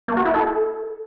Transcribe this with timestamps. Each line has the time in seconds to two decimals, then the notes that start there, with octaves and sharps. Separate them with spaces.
0.08 A#3
0.17 F#4
0.25 E4
0.34 A4